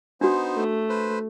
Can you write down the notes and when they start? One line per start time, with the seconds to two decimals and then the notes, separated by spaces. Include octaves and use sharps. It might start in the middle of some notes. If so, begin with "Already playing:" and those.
0.21 B3 D4 D#4 F#4 C5
0.56 A3
0.89 B4 C5